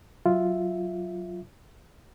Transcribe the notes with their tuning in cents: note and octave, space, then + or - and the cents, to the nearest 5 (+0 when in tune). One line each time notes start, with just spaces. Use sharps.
F#3 +0 F4 +0 E5 +0